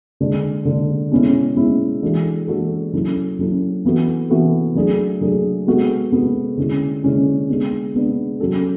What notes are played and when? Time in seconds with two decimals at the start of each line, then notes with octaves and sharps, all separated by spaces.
0.20 D3 G#3 D4
0.65 D3 G#3 D4
1.12 B2 G#3 C#4 E4
1.56 B2 G#3 C#4 E4
2.02 E3 G#3 D4 F#4 A4
2.47 E3 G#3 D4 F#4 A4
2.93 F#3 C#4 E4 A4
3.39 F#3 C#4 E4 A4
3.85 E3 B3 F#4 A4
4.30 E3 B3 F#4 A4
4.75 F#3 A3 D4 G#4
5.21 F#3 A3 D4 G#4
5.67 G#3 B3 F#4 A4
6.12 G#3 B3 F#4 A4
6.57 D3 G#3 C#4 E4
7.03 D3 G#3 C#4 E4
7.49 G#3 B3 D4
7.94 G#3 B3 D4
8.40 F#3 C#4 F#4 A4